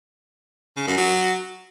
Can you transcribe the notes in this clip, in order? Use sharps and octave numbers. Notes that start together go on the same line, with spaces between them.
C#3
F#2
F#3